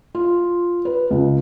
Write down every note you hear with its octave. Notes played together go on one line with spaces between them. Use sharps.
F4
B4
C#2